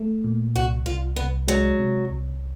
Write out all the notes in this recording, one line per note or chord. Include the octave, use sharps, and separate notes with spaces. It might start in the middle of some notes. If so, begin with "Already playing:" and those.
Already playing: A3
A#2
C2 F#4
C2 F4
C2 B3
F#3 G#3
C3
C2